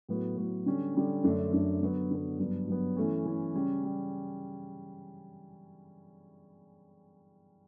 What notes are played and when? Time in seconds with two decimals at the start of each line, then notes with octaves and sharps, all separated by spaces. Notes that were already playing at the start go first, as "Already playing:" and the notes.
0.09 A2 F#3 B3 F#4
0.37 A2 F#3 B3 F#4
0.66 D3 G3 C#4
0.95 D3 G3 C#4
1.24 F#2 D3 A3 D4
1.52 F#2 D3 A3 D4
1.81 D3 F#3 B3
2.11 D3 F#3 B3
2.39 G2 F#3 B3
2.68 G2 F#3 B3
2.97 E3 A3 C#4
3.25 E3 A3 C#4
3.54 C#3 G3 C#4
3.83 G3 C#4